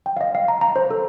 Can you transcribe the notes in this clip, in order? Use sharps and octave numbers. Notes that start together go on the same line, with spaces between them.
G5
F5
D#5
F5
A#5
A#5
C5
A4